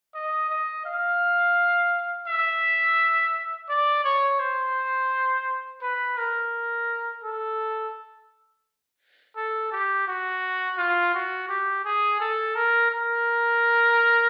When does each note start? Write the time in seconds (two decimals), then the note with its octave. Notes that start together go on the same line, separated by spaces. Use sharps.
0.14 D#5
0.49 D#5
0.85 F5
2.27 E5
3.69 D5
4.04 C#5
4.40 C5
5.82 B4
6.17 A#4
7.24 A4
9.36 A4
9.72 G4
10.08 F#4
10.78 F4
11.14 F#4
11.49 G4
11.85 G#4
12.20 A4
12.55 A#4
12.91 A#4